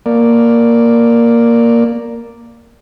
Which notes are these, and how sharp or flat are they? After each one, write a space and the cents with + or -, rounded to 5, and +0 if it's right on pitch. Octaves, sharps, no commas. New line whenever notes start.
A#3 +0 D5 +0